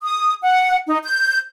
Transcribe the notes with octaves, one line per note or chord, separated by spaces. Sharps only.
D#6
F#5
D#4
G6